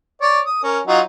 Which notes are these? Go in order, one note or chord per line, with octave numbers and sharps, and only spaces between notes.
C#5 D5
D#6
C#4 A#4
F#3 D#4 F4